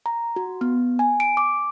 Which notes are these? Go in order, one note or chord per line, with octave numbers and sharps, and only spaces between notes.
A#5
F#4
B3
G#5
D7
D6